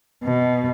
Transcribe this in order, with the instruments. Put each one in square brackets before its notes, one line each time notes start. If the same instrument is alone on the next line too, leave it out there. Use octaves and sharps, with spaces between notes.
[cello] B2